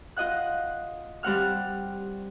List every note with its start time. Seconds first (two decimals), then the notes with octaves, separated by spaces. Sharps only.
0.17 F4 D#5 F#5 F#6
1.23 G3 C4 F#5 F6